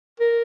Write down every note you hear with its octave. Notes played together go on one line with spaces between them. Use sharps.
A#4